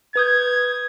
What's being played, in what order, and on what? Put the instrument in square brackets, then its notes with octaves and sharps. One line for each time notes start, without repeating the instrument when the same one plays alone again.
[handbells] B4 D#6 G6 [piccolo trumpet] G#6